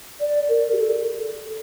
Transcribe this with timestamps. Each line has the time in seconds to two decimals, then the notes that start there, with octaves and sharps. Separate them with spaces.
0.20 D5
0.49 A#4
0.73 G4
0.77 A4